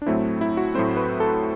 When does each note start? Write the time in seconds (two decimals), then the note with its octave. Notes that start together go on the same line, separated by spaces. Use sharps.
0.02 D4
0.06 A2 F#3 A3 C4 E4
0.41 E4
0.57 F#4
0.74 A2 F#3 A3 C4 C5
0.97 B4
1.20 A4